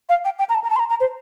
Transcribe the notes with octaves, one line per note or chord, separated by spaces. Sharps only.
F5
G5
G5
A#5
A5
A#5
A5
C6
A#5
A#5
C5